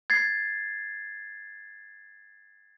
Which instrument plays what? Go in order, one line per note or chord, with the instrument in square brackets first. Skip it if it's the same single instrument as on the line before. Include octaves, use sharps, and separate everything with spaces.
[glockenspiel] G#6 A6 C7